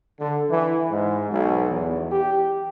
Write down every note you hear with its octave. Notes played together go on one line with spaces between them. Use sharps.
D3
E3
G#2
B1
E2
G4